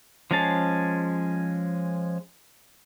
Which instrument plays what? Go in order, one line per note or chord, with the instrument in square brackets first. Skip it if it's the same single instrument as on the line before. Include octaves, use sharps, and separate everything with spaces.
[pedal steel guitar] F3 G#3 C#4 G#4 A5